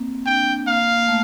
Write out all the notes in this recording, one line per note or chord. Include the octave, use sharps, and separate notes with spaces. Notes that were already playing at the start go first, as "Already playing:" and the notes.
Already playing: A#3 C4
D4 G5
A#3 F5
A#3
A3